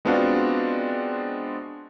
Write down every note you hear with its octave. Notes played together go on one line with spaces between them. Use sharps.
G#3 B3 C4 D4 F4 F#4